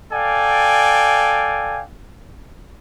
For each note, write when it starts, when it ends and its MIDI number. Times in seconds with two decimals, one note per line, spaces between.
0.12 1.82 69
0.12 1.82 74
0.12 1.82 77
0.12 1.82 79
0.12 1.82 80